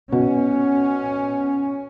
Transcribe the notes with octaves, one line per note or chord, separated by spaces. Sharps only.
B2 C#4